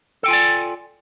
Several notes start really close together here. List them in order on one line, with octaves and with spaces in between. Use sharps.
A4 G5 F4 G#5 D5